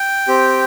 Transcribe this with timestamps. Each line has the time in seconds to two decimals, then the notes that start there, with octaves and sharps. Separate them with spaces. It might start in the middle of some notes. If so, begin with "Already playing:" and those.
Already playing: G5
0.28 C4 G4